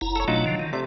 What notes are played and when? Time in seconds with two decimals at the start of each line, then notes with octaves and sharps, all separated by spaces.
0.01 F#1 E4 A#5
0.16 A4 C#5
0.28 B2 F#3 A3 D4 D#4 F4
0.46 D3 F3
0.59 D#3
0.73 C3 A3 D5